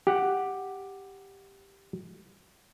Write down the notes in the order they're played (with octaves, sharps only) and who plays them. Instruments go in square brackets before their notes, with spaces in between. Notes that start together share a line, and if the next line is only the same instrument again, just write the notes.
[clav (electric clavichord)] G4 F#5